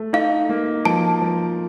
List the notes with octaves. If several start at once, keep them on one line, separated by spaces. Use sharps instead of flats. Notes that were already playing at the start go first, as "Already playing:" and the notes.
Already playing: A3
D#4 F5
A#3
F3 A5
F3